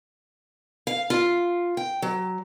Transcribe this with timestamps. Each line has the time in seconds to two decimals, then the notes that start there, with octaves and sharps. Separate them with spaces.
0.87 F5
1.10 F4
1.77 G5
2.02 F#3